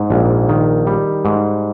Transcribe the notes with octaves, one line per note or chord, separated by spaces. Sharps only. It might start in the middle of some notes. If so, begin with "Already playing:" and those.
Already playing: G#2
A#1
D#3
G3
G#2